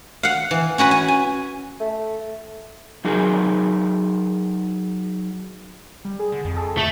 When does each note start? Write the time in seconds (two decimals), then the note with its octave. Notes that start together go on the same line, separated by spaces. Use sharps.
0.23 F5 F#5
0.51 E3
0.78 C#4 F#4 G#5 B5
0.91 G#5
1.08 G#5
1.80 A3
3.05 F#3 D#4 G#4 A#4
6.05 G3
6.19 G#4
6.32 D3
6.45 F2
6.56 G#4 A4
6.77 A3